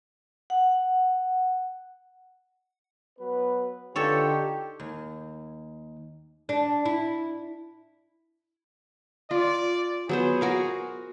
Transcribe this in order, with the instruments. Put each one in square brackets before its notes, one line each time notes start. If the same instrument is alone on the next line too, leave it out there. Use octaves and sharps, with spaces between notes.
[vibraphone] F#5
[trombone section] F#3 B3 B4
[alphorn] D3 [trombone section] D#4 F4 [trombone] G4 [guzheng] A4 C#5
[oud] D#2
D4
E4
[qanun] F4 [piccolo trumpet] D5
[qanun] F#3 B3 C5 [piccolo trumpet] G#4
[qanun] F#4 A#4 F5